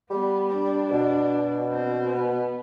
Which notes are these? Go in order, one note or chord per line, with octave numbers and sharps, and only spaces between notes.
G3 B3
D4
B2
C4
B3